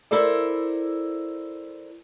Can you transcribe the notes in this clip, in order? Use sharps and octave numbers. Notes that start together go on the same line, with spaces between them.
E4 A4 A#4 C5 D5